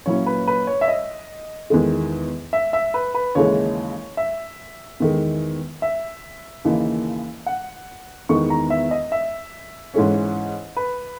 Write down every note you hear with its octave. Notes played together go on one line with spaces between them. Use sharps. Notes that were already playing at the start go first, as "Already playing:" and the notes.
A#2 F#3 C#4 E4 C#5
B4
B4
C#5
E5
D#5
E2 D#3 G#3
E5
E5
B4
B4
D#2 C#3 E3 G#3 C#5
E5
E2 D#3 G#3
E5
D#2 C#3 E3 A#3 D#4
F#5
E2 D#3 G#3 B3 D#4 C#6
A#5
E5
D#5
E5
G#2 E3 G#3 C#4
B4